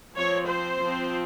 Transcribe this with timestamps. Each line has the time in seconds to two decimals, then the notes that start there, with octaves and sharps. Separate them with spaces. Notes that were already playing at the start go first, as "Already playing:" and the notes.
0.15 F3 C4 C#5
0.47 C5
0.79 F3 C4